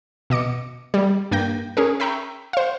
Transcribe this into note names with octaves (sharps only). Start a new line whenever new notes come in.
B2 D#5 D6 C#7
G3
G2 A#3 G5 G6 A#6
C#4 G#4 A#4
E5 G5 A#5 B5 C#6 E6
C5 F5